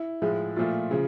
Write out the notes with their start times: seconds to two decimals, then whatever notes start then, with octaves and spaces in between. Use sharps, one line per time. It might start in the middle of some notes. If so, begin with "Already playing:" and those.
Already playing: E4
0.22 A2 F3 G#3
0.56 A#2 F3 A3 F4
0.91 C#3 F3